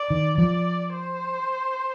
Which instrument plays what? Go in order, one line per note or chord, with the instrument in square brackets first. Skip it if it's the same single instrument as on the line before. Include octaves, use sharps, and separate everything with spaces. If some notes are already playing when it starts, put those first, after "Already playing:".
Already playing: [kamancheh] D5
[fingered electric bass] D#3
[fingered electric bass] F3 [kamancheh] D5
[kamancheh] C5